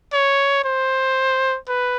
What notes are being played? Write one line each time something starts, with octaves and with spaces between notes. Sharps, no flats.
C#5
C5
B4